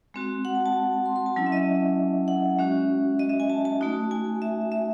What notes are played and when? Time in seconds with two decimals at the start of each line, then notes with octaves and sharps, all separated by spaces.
0.14 G#3 C4 F#4
0.45 F#5
0.55 A5
0.66 A5
1.06 C6
1.16 C6
1.26 A5
1.36 F#3 C#4 E4 G#5
1.46 E5
1.52 D#5
1.56 E5
2.28 F#5
2.59 G#3 C#4 F#4 E5
3.19 D#5
3.30 E5
3.40 G#5
3.50 A5
3.65 A5
3.81 A3 D#4 F#4
4.11 G#5
4.42 E5
4.72 E5